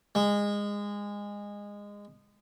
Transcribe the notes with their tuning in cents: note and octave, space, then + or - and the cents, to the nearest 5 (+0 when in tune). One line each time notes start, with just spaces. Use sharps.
G#3 -20